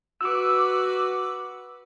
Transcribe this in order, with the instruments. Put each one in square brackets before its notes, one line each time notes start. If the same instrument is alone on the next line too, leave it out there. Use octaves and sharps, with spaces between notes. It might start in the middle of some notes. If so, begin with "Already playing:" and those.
[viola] F#4 B4 [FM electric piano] D6 E6